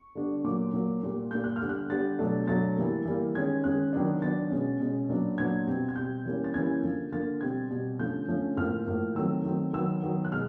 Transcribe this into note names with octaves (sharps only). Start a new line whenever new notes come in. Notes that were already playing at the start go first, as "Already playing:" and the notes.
Already playing: C#6
D3 G3 B3 D4
A#2 F#3 A#3 D6
A#2 F#3 A#3
A#2 G3 A#3
A#2 G3 A#3 G6
F#6
F6
D3 G3 B3
F#6
D3 G3 B3 A6
B2 F#3 A3 D4
B2 F#3 A3 D4 A6
E3 G3 A#3
E3 G3 A#3
D#3 G#3 C#4 G#6
D#3 G#3 C#4 F#6
D#3 F#3 B3 D4
D#3 F#3 B3 D4 A6
B2 G#3 C#4
B2 G#3 C#4
A#2 F#3 B3 D4
A#2 F#3 B3 D4 G#6
B2 G3 C4
G#6
B2 G3 C4 G6
E3 G3 A#3 C#4
A6
E3 G3 A#3 C#4 G#6
D3 F3 A#3
D3 F3 A#3 A6
B2 G3 C4 G#6
B2 G3 C4
D3 F3 A3 C#4 G6
D3 F3 A3 C#4
A2 F3 A#3 F6
A2 F3 A#3
D#3 F#3 A3 C4 E6
D#3 F#3 A3 C4
D#3 F#3 B3 E6
D#3 F#3 B3
F#6
B2 G#3 F6